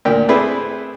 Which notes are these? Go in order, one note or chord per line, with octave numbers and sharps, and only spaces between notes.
D2 A#2 A#4 G5
A3 C4 E4 G#4 B4 D5